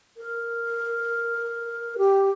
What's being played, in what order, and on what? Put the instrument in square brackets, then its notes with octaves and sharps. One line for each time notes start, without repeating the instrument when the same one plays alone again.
[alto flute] A#4
G4